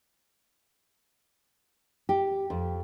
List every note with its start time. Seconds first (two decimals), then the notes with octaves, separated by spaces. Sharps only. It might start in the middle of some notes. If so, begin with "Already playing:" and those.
2.09 G4
2.50 F2